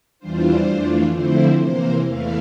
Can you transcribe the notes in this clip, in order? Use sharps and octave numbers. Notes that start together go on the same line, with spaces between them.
E2 E3 G3 D4 F4 C5
F2 E3 A3 D4 F4
D3 F3 A3 C4 E4 C5
C3 E3 A#3 C5
E2 E3 A3 E4 F5